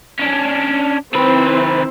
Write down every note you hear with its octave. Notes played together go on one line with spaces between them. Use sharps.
C#4 D4
D#3 C4 E4 B4 C5